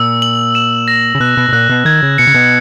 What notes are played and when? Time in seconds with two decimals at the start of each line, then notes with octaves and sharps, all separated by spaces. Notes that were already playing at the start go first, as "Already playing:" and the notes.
Already playing: A#2 E6
0.22 F#7
0.55 E7
0.88 A#6
1.15 C#3
1.20 B2 F#6
1.37 B2
1.49 B2
1.53 A#2 F#6
1.70 B2
1.85 D#3 G#6
2.03 C#3
2.18 B2 C#7
2.27 C#3
2.34 B2